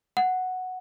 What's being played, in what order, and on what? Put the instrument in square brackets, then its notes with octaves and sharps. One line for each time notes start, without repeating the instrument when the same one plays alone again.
[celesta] F#5